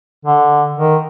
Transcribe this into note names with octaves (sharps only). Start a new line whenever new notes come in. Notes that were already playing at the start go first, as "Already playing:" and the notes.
D3
D#3